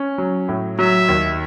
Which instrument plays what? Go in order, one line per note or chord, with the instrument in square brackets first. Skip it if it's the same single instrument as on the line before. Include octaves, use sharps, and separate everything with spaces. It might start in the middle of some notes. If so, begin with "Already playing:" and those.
Already playing: [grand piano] C#4
F#3
A2
[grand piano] F#3 [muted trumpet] E5
[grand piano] D#2